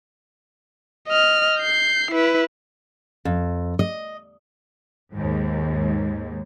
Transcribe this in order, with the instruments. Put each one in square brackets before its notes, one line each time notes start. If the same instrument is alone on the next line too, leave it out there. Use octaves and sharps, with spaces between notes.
[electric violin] D#5 F6
G6 C7
E4 B4
[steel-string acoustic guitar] F2
D#5
[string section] D#2 G#2